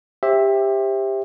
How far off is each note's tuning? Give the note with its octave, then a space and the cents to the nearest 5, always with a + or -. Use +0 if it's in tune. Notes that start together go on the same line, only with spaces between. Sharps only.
G4 +15 C5 +35 E5 +0